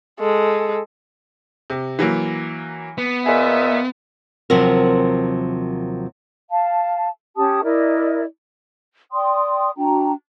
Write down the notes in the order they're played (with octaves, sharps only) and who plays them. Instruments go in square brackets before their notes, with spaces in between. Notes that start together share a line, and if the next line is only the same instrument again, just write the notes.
[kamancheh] G#3 A4
[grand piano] C3
E3 F#3 A#3
[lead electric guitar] B3
[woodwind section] A#2 D#5 E5 [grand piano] G#4
[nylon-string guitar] D#2 C3 F3 F#3 C4 A#4
[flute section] F5 A5
C#4 G4 A5 D#6
E4 A#4 D5 D#5
D5 G5 C6 D#6
D4 F#4 G5 A#5